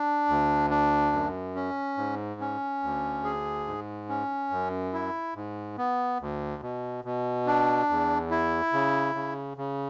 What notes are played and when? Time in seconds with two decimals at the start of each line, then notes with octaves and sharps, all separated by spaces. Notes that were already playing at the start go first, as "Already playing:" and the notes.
Already playing: D4
0.29 D2
0.70 D4
1.13 F#2
1.55 C#4
1.97 G#2
2.41 C#4
2.83 D2
3.24 G#4
3.67 G#2
4.09 C#4
4.51 F#2
4.93 E4
5.35 G#2
5.78 B3
6.21 D2
6.62 B2
7.05 B2
7.46 D4
7.89 E2
8.31 E4
8.73 C#3
9.15 C#3
9.57 C#3